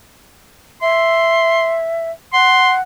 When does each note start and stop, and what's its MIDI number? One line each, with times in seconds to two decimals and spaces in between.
0.82 2.11 76
0.82 1.76 84
2.33 2.81 78
2.33 2.73 84